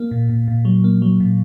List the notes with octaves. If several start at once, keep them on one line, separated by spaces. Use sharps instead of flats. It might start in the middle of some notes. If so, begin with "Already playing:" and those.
Already playing: A#3
A#2
A#2
A#2
F#3
A#3
F#3
A#2